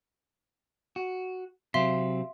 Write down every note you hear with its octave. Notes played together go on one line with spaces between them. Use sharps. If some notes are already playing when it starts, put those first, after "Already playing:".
F#4
C3 F#3 C4 E5 F5 C6